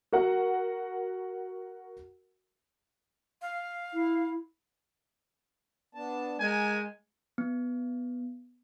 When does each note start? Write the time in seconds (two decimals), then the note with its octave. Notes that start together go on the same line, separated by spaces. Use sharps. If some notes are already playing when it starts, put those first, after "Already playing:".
0.13 F#4 A#4 F#5
3.42 F5
3.94 E4
5.95 B3 D4 A5
6.40 G#3 A#4 G#5
7.38 B3